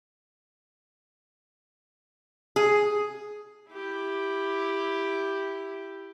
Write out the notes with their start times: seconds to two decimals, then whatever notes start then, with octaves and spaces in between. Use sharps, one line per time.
2.56 G#4
3.71 E4 G4